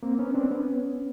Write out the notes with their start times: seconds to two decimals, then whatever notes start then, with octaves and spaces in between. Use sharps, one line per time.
0.03 A#3 C4
0.19 B3 C#4
0.34 C4 D4
0.51 B3 C#4